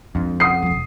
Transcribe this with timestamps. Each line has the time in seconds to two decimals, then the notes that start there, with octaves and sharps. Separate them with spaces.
0.15 F2 G#3 D4
0.40 C#3 F#5 D#6 C7
0.62 E1 F3